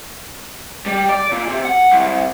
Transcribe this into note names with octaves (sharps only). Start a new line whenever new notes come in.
G3
D5
A#2
C3
F#5
C2